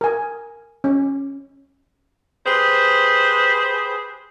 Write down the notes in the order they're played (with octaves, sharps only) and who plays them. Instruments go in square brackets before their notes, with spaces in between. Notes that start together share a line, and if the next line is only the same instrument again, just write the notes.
[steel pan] A#4 G#5
C#4
[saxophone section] G4 G#4 B4 C5